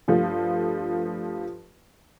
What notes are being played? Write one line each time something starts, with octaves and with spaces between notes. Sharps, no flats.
G2 F3 A3